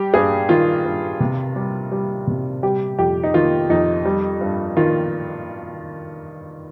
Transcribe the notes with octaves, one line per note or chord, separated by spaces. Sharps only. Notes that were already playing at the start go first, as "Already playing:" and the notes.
Already playing: G3 G4
G2 G#4
D#3 F4
G2
C3
G3
G3
C3
G3 G4
F2 G4
D#4
D#3 F4
F2 D#4
G3
G2
D#3 F4